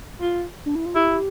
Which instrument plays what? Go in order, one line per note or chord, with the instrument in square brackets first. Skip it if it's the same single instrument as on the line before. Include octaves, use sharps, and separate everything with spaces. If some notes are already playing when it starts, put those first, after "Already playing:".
[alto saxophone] F4
[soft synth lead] D4
E4
F4
[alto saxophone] E4 [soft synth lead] G4